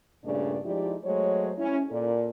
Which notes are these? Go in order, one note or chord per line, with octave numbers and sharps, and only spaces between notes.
G2 A#2 C#3 A3 D4 D5
F3 G#3 D#4 E4 G4 D5
F#3 G#3 A3 C5 C#5
C#4 E4
A#2 A4 D5